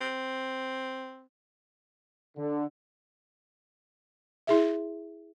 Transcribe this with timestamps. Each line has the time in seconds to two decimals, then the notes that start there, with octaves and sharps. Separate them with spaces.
0.01 C4
2.37 D3
4.47 E4 G#4 E5